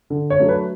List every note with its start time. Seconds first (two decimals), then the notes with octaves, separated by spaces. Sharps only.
0.10 D3
0.30 C#5
0.40 F#3 A3 D4
0.49 B4